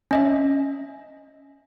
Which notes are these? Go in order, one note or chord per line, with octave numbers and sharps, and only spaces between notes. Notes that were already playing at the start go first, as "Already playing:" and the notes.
C#4 D#5 E5